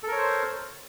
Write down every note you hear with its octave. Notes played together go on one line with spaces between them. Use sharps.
A4 A#4 C5 C#5